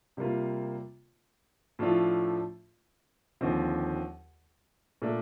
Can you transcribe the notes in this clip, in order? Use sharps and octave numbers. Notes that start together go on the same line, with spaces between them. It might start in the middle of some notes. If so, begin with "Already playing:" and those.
C3 G3 A#3 F4
A2 F3 A3 D4 F4
D#2 D3 F3 C4
A#2 A3 D4